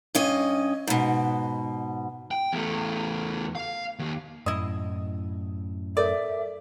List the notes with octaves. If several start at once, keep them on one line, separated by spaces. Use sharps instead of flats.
G2 C#4 D#5
G#2 B2
G5
E2 A3
F5
D#2
F#2 A2 E4 D#5
A4 A#4 C#5 D5 E5